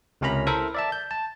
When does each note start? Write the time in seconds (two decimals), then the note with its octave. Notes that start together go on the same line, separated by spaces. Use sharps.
0.21 C#2 C3 C#4 A#4 A#5 B5
0.47 E4 A4 A#4 C5 E5
0.75 D5 E5 A5
0.92 G6
1.11 A5